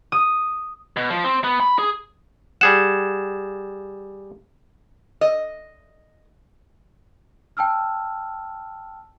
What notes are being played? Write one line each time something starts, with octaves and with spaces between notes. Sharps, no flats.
D#6
B2
F3
C4
B3
B5
G#4
G3 G#4 F#5 E7
D#5
G5 A5 E6 F6